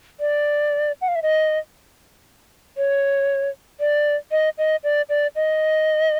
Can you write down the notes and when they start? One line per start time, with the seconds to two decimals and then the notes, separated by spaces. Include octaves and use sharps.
0.20 D5
1.01 F#5
1.08 F5
1.15 E5
1.22 D#5
2.77 C#5
3.80 D5
4.31 D#5
4.58 D#5
4.84 D5
5.09 D5
5.36 D#5